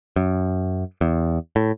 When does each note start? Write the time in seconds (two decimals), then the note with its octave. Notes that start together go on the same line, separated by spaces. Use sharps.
0.16 F#2
1.01 E2
1.56 A2